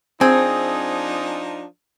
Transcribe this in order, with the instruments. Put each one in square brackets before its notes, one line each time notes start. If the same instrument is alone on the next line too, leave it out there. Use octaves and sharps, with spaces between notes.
[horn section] F3 D4 D#4 [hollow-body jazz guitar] C4 [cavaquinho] G#4